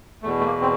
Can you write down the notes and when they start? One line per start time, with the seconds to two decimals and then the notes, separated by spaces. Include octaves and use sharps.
0.23 E2 B2 A3
0.40 A3
0.46 A#3
0.62 C4